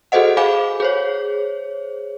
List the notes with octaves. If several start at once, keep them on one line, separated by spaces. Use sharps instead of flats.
F#4 G#4 A4 C5 D#5 F#5
G#4 C5 F5 G#5 B5 D6
G#4 C5 C#5